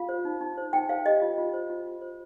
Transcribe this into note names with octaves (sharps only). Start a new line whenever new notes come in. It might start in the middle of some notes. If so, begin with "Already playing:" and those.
Already playing: F4 F5
C5
D#4
D#4
C5
D#4 G5
C5 F5
G4 D#5
F4
F4
C5
F4
F4
C5